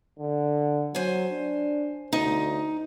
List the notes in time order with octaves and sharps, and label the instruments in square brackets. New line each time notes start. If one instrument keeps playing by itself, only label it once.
[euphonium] D3
[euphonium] F#3 [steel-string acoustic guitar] C5 G#5
[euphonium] D4
[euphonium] D2 [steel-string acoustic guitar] D#4